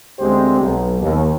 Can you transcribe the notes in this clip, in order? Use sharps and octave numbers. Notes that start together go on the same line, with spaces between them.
D2 G#3 C4 G4 C5
B1
D#2